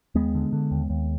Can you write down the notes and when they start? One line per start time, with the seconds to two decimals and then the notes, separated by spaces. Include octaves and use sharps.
0.15 D#2 G#3 B3
0.35 D3
0.53 D3
0.71 D#2
0.90 D#2